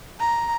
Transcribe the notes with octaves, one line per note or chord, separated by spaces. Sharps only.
A#5